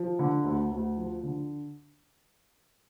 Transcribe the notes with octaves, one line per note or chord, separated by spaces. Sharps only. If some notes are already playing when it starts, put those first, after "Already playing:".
Already playing: F3
D3
D2
D2
F3
D3